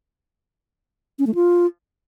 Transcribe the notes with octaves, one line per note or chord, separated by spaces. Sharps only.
C#4
A3
F4